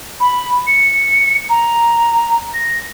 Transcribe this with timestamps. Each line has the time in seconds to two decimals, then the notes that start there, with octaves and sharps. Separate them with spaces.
0.20 B5
0.67 C#7
1.49 A#5
2.54 A#6